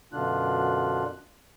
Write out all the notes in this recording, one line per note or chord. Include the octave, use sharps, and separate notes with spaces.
F#2 B2 D3 D4 F4 F#6